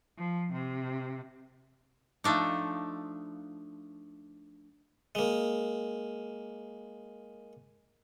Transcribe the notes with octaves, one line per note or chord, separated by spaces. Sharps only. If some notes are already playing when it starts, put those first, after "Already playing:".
F3
C3
F3 A3 D4 D#4
G#3 A#3